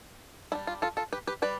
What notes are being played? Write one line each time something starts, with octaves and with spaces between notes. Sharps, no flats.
G3 D4 E4
F4
F4 A4
F4 A4
G4 B4
G4 B4
G3 B4 D5